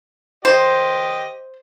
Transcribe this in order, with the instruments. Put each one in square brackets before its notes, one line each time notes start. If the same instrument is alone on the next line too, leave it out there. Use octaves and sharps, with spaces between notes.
[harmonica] G4 D#5 [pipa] C5